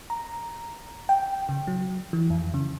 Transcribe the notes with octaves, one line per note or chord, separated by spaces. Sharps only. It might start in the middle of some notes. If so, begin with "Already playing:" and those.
A#5
G5
C#3
F#3
E3
F2
C#3